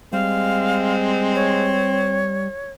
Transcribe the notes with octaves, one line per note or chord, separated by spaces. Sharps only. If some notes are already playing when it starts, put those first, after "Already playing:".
G3 G#3 C4 F5
C#5